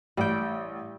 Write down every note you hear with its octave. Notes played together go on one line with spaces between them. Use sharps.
A1 G3 G5